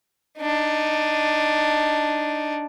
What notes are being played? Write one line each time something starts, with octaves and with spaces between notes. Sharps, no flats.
D4 D#4